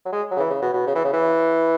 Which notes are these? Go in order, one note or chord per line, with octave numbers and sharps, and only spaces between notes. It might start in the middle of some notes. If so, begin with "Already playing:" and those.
F#3
G#3
F#3
C#3
E3
C#3
B2
B2
C#3
E3
C#3
E3